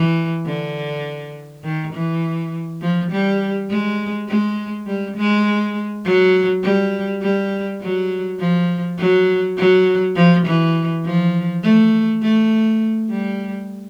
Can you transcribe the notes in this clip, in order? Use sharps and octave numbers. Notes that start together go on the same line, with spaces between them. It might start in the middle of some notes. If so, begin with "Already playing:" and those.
Already playing: E3
D3
D#3
E3
F3
G3
G#3
G#3
G3
G#3
F#3
G3
G3
F#3
F3
F#3
F#3
F3
E3
F3
A3
A3
G3